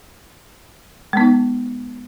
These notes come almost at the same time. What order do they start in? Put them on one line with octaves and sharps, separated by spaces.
G#3 B3 D#4